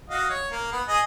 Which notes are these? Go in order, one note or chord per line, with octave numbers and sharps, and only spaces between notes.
F#4 D#5 F5
C#5
A#3
B3
G#4 D#5